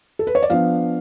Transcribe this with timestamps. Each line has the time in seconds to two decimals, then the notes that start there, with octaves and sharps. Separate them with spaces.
0.19 A4
0.27 B4
0.35 C#5
0.42 D5
0.50 F3 B3 D4 F5